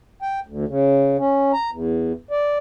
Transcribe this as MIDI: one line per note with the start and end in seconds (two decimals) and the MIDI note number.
0.22 0.40 79
0.46 0.65 38
0.68 1.17 49
1.18 1.52 61
1.53 1.70 82
1.72 2.13 40
2.31 2.58 74